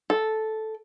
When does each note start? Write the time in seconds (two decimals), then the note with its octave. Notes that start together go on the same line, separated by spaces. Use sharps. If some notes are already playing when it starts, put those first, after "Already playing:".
0.10 A4